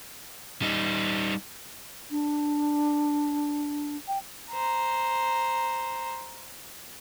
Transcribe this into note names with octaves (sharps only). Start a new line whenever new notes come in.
G3 D#4
D4
G5
C5 A#5